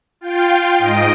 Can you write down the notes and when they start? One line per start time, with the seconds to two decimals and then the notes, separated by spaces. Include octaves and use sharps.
0.21 F4 G5
0.78 G#2 D#5 D7